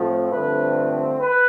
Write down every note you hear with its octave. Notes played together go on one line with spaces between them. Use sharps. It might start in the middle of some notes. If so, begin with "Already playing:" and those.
Already playing: A2 F3 A3 C4
G2 D3 F3 A3 C4 B4
B4